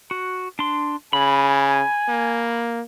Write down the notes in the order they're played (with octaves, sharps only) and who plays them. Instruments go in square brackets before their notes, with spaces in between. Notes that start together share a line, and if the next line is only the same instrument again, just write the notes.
[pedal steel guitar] F#4
D4 C6
[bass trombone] C#3 [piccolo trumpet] G#5 [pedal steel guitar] B5
[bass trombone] A#3